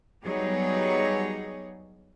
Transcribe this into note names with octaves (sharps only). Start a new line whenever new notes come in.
F#3 G3 B3 D#4 G#4 C#5